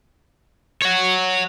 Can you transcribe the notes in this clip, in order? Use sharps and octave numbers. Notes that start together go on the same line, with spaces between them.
C#5 F#5